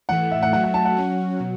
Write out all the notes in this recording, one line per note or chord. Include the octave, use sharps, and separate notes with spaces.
A2 E3 A3 F#5
E5
F#5
F#3 A3 F#4 F#5
F#5
A5
F#5
F#3 C#4 F#4
B2 F#3